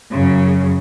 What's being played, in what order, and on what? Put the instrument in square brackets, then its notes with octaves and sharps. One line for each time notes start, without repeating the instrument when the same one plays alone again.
[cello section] F#2 C#3